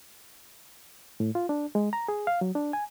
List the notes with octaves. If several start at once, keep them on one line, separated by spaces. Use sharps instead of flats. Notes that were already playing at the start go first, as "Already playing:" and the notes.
A2
F4
D4
G#3
A#5
G#4
F5
F#3
D4
G#5